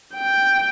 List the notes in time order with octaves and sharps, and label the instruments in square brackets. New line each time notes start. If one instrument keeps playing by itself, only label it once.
[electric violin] G5